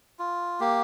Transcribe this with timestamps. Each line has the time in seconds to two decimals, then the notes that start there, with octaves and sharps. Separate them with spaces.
0.19 F4
0.60 A#3 G4